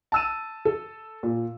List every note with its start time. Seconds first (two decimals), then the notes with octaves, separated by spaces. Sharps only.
0.12 A5 E6 D#7
0.65 A4
1.23 A#2